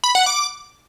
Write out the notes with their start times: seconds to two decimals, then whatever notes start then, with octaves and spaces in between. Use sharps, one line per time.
0.04 B5
0.15 F#5
0.26 D6